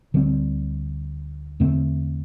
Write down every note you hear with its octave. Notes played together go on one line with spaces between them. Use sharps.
D2 D3 G3 C4
E2 D3 A3 C4